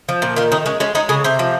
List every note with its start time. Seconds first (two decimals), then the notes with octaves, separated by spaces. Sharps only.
0.09 F3
0.22 A#2
0.36 D#3 F4
0.52 D#3 D#4
0.66 G#3 C#4
0.80 G#3 C#4
0.95 G#3 D#4
1.09 C#3 G#4
1.24 C3 C5
1.39 F3